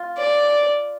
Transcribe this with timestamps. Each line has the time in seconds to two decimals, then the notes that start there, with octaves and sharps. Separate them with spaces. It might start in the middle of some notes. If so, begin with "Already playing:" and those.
Already playing: F4
0.18 D5